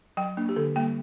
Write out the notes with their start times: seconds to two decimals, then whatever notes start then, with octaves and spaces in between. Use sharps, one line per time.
0.17 F#3 G5
0.37 A#3 D4
0.49 G4
0.56 D3 A4
0.76 G3 A#3 G5